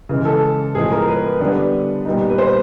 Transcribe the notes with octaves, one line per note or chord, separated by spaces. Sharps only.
C#3 E3 G#3
A4
A2 F3 G#3 B3 G#4
A#4
B4
D3 G3 B3 D4
A#2 G3 B3 D#4
B4
C5